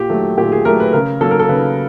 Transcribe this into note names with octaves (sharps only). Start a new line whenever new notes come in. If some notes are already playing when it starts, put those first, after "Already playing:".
Already playing: A#2 G4
F#3 A3
A#2 G4
G#4
F#3 A3 A#4
B4
C#3 A#4
F#3 A#3 A4
A#4
A4
C#3 B4